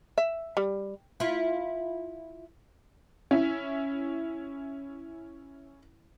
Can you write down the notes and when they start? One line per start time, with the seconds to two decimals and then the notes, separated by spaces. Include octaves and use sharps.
0.18 E5
0.57 G3
1.20 E4 F4
3.31 C#4 E4